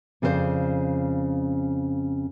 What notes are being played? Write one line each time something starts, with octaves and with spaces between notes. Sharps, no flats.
F2 C#3 C4 E4 C5 D5